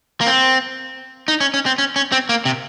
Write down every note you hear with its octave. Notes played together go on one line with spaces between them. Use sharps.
A#3
C4
D#4
C#4
C#4
C4
C#4
C#4
C4
A#3
C3